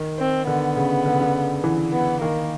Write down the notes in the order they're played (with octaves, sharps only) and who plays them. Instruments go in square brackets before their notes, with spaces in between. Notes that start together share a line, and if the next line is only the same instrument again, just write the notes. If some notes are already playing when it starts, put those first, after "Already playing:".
Already playing: [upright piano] D#3
[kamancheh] C4
[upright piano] D3 [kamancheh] B3
[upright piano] C#3
D3
C#3
D3
E3
[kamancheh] B3
[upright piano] D#3 [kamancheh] A#3